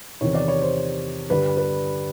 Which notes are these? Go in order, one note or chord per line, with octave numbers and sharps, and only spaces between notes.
E2 C3 D#3 C#5
D5
C#5
C5
G2 D3 G3 B4
B4